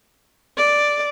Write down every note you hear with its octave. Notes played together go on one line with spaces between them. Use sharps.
D5